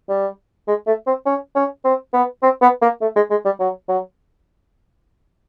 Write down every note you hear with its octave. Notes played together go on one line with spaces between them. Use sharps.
G3
G#3
A3
C4
C#4
C#4
C4
B3
C4
B3
A#3
A3
G#3
G#3
G3
F#3
F#3